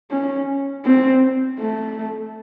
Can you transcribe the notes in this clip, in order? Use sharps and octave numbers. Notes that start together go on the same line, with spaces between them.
C#4
C4
A3